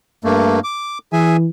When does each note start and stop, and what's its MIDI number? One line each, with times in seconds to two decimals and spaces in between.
0.24 0.60 43
0.24 0.60 57
0.24 0.60 58
0.64 0.98 86
1.13 1.47 52
1.13 1.37 68
1.13 1.37 76
1.13 1.37 80